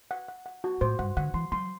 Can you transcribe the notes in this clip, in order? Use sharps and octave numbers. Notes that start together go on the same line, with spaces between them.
F#5
F#5
F#5
F#4
A2 C5
G2 F#5
D3 F#5
E3 C6
F#3 C6